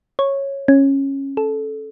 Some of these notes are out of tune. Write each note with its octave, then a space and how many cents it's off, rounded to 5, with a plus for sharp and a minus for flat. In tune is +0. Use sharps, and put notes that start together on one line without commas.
C#5 -10
C#4 -15
A4 -15